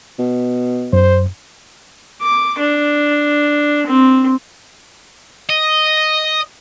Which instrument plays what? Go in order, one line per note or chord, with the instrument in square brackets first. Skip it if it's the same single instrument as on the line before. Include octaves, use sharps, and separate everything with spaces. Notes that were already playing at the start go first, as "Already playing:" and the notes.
[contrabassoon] B2
[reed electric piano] F#2 [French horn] C5
[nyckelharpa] D6
D4
C4
[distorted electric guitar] D#5